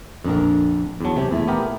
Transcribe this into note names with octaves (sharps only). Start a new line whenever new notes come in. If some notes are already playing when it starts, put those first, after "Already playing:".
A#1 F2 D3 A#4
E2 D#3 F#3 A5
C3 G4 G#4
E2 A#2 A3 E4
B3 G4 A#4